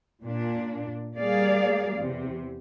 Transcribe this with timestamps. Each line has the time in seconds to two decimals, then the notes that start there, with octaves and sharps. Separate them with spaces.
0.22 A#2 D4
1.17 G3 A#3 G#4 D5 F5
1.96 E2 C3